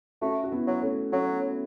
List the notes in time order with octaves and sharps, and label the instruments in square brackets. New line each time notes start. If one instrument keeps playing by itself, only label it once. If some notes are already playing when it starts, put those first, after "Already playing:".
[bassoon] A3 [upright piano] C#4 F#4
[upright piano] F#4
B3 E4
[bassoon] F#3
[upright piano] A3 C#4
[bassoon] F#3 [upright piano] A3 C#4